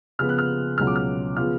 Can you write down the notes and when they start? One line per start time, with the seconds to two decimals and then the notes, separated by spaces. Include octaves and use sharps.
0.19 C#3 F3 B3 F4 F6
0.29 F#6
0.39 F6
0.78 C#2 B2 F#3 C#4 F4 F6
0.87 D6
0.96 F6
1.37 C#3 F3 B3 F4 F6